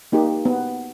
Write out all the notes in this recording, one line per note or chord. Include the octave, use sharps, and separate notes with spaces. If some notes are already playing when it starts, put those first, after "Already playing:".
A#3 D#4 G4
B3